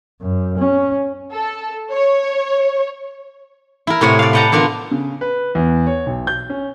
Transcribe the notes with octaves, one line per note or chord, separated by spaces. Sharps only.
F#2
C#4
A4
C#5
E4 A#4
A2 C3 C#5 F#5
D5 F5
B4 D#5 F#5 G5 A5 A#5
D3 B3 D4 F4 A#4
C#3
B4
E2
C#5
B1
G6
C#4